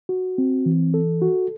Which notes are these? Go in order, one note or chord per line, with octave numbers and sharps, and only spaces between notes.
F#4
C4
E3
A4
F#4